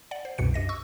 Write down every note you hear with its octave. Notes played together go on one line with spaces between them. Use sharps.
D5 F#5
C5
C2 F#2 B2 C#7
G2 D#5 A#6
C#6 E6